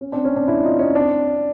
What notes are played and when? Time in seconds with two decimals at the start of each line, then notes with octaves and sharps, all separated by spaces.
0.01 C#4
0.12 C4 D4
0.25 C#4
0.36 C4 D4
0.48 D4 E4
0.63 D#4 F4
0.79 C#4 D#4
0.95 C4 D4